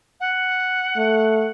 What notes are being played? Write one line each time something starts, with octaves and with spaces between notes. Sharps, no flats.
F#5
A3